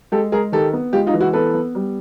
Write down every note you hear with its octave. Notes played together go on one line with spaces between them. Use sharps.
G#3 G4 A4
G#3 G#4 A#4
D#3 G4 A4
B3
G#3 F4 G4
D#4 F4
E3
E4 F#4
B3 A4 B4
B3
G3